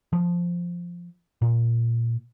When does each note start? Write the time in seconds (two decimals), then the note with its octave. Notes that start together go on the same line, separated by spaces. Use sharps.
0.13 F3
1.42 A#2